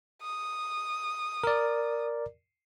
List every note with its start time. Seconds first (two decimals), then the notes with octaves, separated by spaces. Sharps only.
0.22 D#6
1.44 A#4 D5